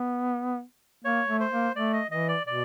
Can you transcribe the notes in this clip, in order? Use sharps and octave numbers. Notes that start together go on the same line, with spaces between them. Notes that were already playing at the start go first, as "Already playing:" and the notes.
Already playing: B3
A#3 C#5
A3
C5
A#3
A3 D5
D#5
E3 D#5
D5
B2 D5